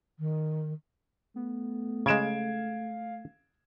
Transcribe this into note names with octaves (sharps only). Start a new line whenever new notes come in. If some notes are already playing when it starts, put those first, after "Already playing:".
D#3
A3 B3
C#3 G#3 F5 G#6 D7 E7